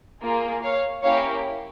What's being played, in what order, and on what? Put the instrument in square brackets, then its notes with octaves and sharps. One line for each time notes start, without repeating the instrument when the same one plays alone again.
[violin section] A#3 F4 G#4
C#5 F5
A#3 C#4 E4 G4 C#5 F5